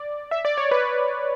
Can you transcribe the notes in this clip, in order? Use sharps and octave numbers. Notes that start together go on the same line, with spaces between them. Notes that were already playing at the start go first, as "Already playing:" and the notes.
Already playing: D5
E5
D5
C#5
B4